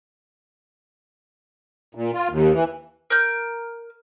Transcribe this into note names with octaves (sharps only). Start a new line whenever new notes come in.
A#2
F4
D#2
E3
A#4 G6